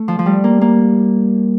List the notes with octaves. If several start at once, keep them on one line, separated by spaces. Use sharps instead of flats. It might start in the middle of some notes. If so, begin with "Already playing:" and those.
Already playing: A3
F3
F3
G3
A#3
A#3